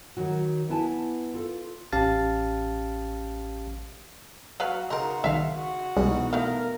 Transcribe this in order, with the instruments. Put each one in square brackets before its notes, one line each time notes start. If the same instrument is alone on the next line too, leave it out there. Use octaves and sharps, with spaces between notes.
[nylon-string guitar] D#3 F#3 F#4
B3 E4 B4 G#5 A5
F4 A4
[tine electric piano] A1 C#4 G4 F5 A5 A6
[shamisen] F#3 B4 F5 [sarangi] F#4
[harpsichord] C#3 F#5 C6 [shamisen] D#4 A#4 [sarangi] F#4
[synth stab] C2 D#3 [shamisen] E5 F5
[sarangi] F#4
[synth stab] C2 G3 G#3 [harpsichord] B2 E3 D#4
[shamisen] A3 B3 F5 [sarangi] A#4